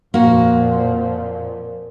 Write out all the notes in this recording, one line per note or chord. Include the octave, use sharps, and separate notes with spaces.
F2 A#2 F3 A#3 F#4